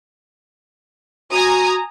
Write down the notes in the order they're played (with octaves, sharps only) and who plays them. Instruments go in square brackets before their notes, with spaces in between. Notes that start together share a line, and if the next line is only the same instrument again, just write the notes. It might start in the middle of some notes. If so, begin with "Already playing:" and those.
[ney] F#4 [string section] G#5 A#5 D#6